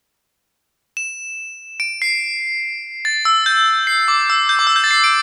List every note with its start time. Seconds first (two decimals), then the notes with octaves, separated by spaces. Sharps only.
0.97 E7
1.80 D7
2.02 C7
3.05 A6
3.25 E6
3.46 G6
3.87 C7
4.08 D6
4.30 E6
4.49 G6
4.59 D6
4.67 E6
4.76 G6
4.84 A6
4.91 C7
5.04 D7